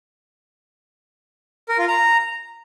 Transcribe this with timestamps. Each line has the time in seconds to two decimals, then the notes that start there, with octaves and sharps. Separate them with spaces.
1.69 A#4
1.78 F4
1.88 A#5